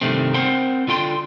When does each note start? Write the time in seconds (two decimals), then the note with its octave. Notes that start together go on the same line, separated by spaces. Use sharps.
0.01 G2 C3 D#3 A3 C4
0.34 C4 A#4 C5 F#5 G5
0.88 D3 F4 G5 C6